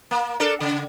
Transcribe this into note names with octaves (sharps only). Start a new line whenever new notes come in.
A#3
D4 A4 A#4
C#3